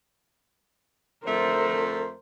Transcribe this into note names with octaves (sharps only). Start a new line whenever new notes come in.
F2 D3 A3 A#4 C5